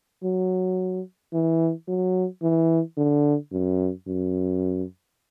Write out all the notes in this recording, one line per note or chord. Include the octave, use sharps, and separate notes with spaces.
F#3
E3
F#3
E3
D3
F#2
F#2